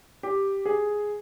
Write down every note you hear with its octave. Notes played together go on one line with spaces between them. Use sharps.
G4
G#4